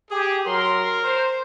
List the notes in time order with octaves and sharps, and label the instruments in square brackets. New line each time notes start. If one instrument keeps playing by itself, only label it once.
[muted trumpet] G4 [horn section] G#4
[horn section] F#3 C6 [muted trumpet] A#4
[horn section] C5